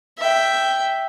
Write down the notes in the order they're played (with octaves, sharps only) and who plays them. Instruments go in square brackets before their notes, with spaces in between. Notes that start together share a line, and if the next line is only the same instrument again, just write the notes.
[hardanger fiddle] E5 G5